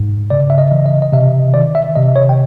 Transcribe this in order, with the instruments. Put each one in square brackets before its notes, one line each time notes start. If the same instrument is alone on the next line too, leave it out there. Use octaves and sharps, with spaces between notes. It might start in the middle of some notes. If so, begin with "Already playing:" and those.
Already playing: [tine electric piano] G#2
C#3 D5
E5
D#5
E3
D#5
D#5
C3 E5
D#3 D5
E5
C3 D#5
C#5
G5